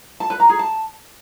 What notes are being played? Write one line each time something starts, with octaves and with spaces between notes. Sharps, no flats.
A5
B4
A#5
G#4
A5